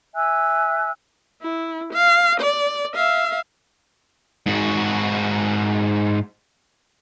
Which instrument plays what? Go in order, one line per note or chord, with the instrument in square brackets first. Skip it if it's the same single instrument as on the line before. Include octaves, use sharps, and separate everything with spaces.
[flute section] E5 G#5 E6 F#6
[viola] E4
F5
D5
E5 F5
[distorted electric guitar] G#2 F#4